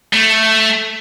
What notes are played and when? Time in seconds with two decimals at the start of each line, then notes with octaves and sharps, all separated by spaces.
0.14 A3